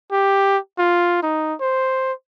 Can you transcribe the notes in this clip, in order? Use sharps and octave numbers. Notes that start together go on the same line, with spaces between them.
G4
F4
D#4
C5